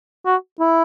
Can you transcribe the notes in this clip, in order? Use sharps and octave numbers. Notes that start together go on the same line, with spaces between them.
F#4
E4